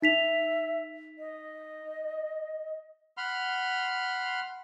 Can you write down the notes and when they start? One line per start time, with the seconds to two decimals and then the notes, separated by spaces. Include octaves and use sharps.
0.02 D#4 E5 B6 F7
1.18 D#5
3.17 F#5 B5 C6 F6